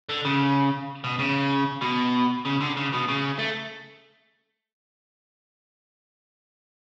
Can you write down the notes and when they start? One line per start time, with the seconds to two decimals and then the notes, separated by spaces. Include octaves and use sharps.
0.09 D3
0.25 C#3
1.04 B2
1.19 C#3
1.82 B2
2.46 C#3
2.61 D3
2.77 C#3
2.93 B2
3.08 C#3
3.39 A3